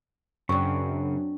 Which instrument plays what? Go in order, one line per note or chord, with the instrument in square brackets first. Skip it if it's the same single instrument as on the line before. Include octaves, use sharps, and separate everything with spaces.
[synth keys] F#2 [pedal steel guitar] C#3 [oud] C4 D4 [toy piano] C#6